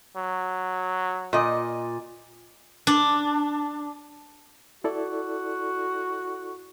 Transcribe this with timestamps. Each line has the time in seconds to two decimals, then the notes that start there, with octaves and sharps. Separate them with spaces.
0.17 F#3
1.33 A#2 D#5
2.87 D4
4.84 E4 F#4 A4 D5